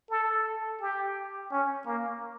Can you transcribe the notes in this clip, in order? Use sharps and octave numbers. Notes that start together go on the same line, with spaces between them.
A4
G4
C#4
A#3